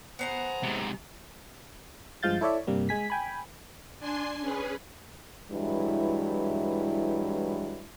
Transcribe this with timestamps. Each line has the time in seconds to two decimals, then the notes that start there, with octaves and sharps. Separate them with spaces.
0.19 B3 G#4 C5 F#5 A#5
0.63 G#2 C3
2.23 G2 F3 G#3 F5 G6 A6
2.41 E4 A4 C#5 D5 E5
2.67 G2 C3 G3 A#3
2.89 G#3 G#5 B6
3.10 G5 G#5 B5
3.99 D4 G#5 C6 C7
4.40 C#4 G#4 B4
5.51 G2 E3 F#3 G#3 E4